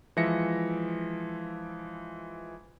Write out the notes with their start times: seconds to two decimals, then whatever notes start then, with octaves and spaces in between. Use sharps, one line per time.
0.17 E3 F3 G#3 E5 A#6 C#7